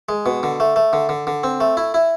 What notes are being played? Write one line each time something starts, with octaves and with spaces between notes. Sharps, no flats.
G#3
B2
D3
A3
A3
D3
D3
D3
C4
A3
E4
E4